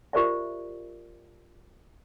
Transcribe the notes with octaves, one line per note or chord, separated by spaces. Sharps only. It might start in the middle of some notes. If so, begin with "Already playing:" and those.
F4 G4 A#4 C5 D5 E5